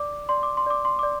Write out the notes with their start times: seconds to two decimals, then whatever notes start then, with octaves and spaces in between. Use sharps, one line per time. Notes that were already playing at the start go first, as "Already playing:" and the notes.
Already playing: D5 D6
0.29 D5 C6
0.43 D6
0.57 C6
0.66 D5 D6
0.85 C6
0.99 D5 D6